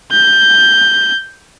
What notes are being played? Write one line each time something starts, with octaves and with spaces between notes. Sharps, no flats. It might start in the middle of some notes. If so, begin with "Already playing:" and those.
G6